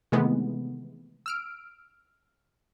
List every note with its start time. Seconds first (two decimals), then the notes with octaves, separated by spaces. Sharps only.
0.12 C3 D#3 E3 G#3 A3 B3
1.26 E6 F6 D7